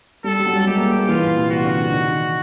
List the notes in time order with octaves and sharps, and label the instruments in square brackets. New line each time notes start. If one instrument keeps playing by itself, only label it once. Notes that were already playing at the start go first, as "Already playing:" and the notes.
[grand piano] G3 [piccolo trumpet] A4
[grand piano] G3
F#3
G3
[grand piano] G#3 [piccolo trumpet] G4
[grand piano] A#3
A#3
A#3
[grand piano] E3 [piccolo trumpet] F4
[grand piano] A#2
C3
[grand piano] C3 [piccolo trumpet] F#4
[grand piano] D3
D3
D#3